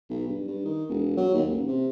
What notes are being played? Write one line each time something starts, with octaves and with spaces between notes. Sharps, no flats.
B1
G2
G2
D#3
E1
F#3
D#2
A1
C3